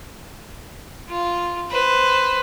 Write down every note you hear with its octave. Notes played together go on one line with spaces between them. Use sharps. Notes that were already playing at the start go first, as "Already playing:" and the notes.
F4
B4 C5